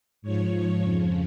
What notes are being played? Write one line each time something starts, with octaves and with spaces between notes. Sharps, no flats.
G#2 F3 C#5
F2 C#3 F3